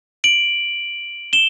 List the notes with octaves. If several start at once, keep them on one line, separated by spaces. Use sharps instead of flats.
D7 F#7
E7 G7